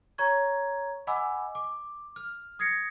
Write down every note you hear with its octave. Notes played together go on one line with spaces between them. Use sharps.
C#5 A#5 C#6 G#6
D#5 F#5 G#5 B5 D6 E6
D6
F6
D#6 G#6 A#6 C7 C#7